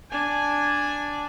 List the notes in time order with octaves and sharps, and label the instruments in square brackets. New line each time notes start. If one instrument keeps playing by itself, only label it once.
[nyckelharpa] D4 G#5